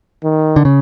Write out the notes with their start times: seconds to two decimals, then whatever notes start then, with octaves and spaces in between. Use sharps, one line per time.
0.24 D#3
0.56 D3
0.65 C#3